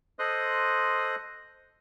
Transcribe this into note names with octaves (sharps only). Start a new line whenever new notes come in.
A4 C5 D#5 C6 D#6 F#6